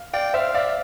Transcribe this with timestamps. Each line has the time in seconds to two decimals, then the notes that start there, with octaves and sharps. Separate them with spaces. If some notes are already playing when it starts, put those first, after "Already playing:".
Already playing: F5
0.13 D5 F5 G5
0.34 C5 E5 F5
0.54 D5 E5 F5